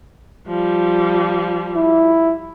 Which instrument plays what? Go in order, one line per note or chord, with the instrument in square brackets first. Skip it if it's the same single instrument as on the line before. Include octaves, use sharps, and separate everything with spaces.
[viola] F3 G3
[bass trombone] E4